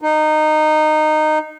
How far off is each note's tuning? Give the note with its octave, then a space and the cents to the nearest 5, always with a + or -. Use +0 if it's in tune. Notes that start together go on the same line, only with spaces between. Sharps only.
D#4 -15